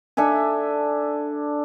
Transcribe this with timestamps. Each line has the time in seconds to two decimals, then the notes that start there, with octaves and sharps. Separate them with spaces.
0.17 D4 A4 E5 G#5